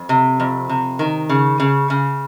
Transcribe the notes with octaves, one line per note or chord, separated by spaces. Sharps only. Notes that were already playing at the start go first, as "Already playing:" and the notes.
Already playing: F2
C3
F2
C3
D#3
C#3
C#3
C#3